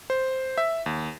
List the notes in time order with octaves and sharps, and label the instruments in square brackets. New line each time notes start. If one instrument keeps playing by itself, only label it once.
[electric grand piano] C5
E5
D#2